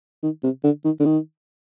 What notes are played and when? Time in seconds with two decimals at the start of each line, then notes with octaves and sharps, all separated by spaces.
0.23 D#3
0.43 C3
0.64 D3
0.84 D#3
1.00 D3
1.05 D#3